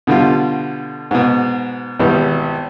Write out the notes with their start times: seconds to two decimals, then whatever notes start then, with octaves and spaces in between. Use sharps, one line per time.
0.07 B2 D3 G3 F4
1.11 G#2 B2
1.99 G#1 B2 E3 G3